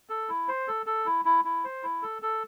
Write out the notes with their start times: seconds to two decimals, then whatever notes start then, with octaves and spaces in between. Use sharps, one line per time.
0.09 A4
0.29 E4
0.48 C5
0.68 A4
0.86 A4
1.06 E4
1.25 E4
1.45 E4
1.64 C5
1.83 E4
2.02 A4
2.22 A4